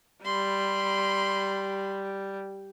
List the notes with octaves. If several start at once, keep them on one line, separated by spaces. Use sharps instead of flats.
G3 B5 C6